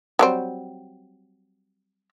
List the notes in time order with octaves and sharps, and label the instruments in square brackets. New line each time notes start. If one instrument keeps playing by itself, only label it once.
[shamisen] F#3 G3 C4